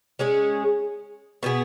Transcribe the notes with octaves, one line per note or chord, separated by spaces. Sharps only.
G#3 C#4 G#4
B2 B3 G#4